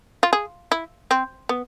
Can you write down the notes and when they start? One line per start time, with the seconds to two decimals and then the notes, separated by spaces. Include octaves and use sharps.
0.23 F4
0.33 G#4
0.72 E4
1.11 C4
1.49 B3